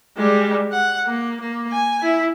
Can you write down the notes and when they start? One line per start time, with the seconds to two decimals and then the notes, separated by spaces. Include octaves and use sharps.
0.17 G3 G#3
0.72 F#5
1.07 A#3
1.40 A#3
1.72 G#5
2.02 E4